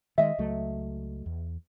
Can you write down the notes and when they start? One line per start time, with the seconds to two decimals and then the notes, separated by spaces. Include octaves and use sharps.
0.18 D#3 G#3 D#5 E5
0.38 C#2 F#3 A3
1.26 E2